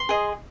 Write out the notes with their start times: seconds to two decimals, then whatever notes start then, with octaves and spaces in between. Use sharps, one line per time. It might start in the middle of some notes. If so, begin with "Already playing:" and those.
Already playing: C6
0.09 G#4 D#5